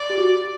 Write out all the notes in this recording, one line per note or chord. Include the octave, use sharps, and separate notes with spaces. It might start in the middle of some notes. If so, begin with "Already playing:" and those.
Already playing: D5
G4
F#4